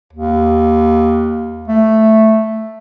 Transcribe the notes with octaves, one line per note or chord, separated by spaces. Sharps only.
D#2
A3